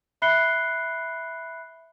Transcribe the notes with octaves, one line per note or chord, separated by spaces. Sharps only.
E5 B5 F#6 C7 C#7 G7